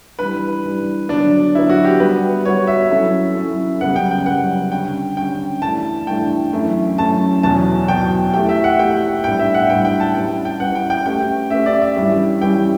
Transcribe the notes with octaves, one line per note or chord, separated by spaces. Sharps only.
E3 G3 D4 B4
E3 G3 D4
D3 F#3 B3 D4
D3 F#3 B3 E4
F#4
G4
G3 B3 F#4 B4
G3 B3 F#4 C#5
E5
F#3 C#4 E4 A4
F#3 C#4 E4 A4
F#2 C#3 G3 B3 F#5
G5
G5
F#2 C#3 G3 B3 F#5
D3 G3 C#4 G5
D3 G3 C#4 G5
G2 E3 A3 D4 A5
G2 E3 A3 D4 G5
F#2 E3 A3 C#4 E4
F#2 E3 A3 C#4 E4 A5
E2 B2 F#3 A5
E2 B2 F#3 G5
A3 E4 G4 G5
E5
F#5
A3 E4 G4 G5
A2 G3 B3 D4 G5
E5
F#5
A2 G3 B3 D4 G5
G5
A5
G3 C#4 E4 B4 G5
G5
G3 C#4 E4 B4 F#5
G5
G5
A3 C#4 G4 B4 G5
A3 C#4 G4 B4 E5
D5
E5
G2 E3 G3 C#4 G4
G2 E3 G3 C#4 G4 G5